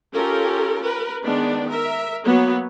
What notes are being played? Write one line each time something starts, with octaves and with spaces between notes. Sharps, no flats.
C#4 F4 G4 A4 A#4
A#4 B4
D#3 G#3 B3 D4 D5
A#4 E5
F#3 A#3 B3 C#5